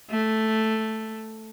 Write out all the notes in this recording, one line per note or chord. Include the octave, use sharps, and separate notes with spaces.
A3